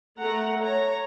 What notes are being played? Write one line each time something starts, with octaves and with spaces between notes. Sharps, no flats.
A3 F#5 A#5
C#5 A#5